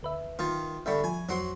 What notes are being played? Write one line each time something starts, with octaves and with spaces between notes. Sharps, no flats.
D2 B4 E5
D#3 F4
G2 D3 E5 B5 C#6
F3 G#5
F2 F#3 F#4 C5 F#5 C6